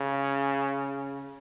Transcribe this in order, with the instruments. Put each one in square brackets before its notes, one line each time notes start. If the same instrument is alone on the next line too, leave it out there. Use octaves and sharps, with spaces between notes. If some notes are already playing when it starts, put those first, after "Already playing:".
Already playing: [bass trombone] C#3